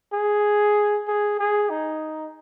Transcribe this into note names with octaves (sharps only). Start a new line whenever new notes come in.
G#4
G#4
G#4
D#4